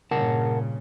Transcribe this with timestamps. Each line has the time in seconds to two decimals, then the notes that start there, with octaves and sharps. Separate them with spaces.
0.11 G2 A#2 C#3 A#4 F#5 A5